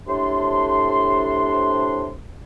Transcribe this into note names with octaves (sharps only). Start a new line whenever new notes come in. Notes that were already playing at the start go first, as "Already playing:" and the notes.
A2 C3 D4 C6